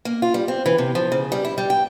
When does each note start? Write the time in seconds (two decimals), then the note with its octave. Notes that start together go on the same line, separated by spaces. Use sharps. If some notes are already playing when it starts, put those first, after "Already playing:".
0.05 A#3
0.22 F4
0.34 G3
0.48 C4
0.66 E3
0.78 C3
0.95 F3
1.12 C#3
1.32 G3
1.45 E4
1.58 G3
1.70 G5